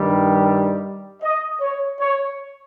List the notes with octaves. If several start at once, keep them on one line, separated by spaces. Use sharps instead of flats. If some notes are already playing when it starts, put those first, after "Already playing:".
Already playing: G2 D#3 G3
D#5
C#5
C#5